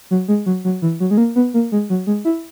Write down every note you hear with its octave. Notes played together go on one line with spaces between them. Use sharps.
F#3
G#3
F#3
F#3
E3
F#3
G#3
A#3
B3
A#3
G#3
F#3
G#3
E4